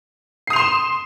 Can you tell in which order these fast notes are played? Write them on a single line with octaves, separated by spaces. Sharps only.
C7 D#6 F7 C6 E7